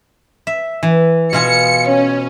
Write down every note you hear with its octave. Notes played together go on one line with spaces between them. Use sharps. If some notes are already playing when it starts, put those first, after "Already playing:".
E5
E3
B2 F4 G#4 C#7
C#4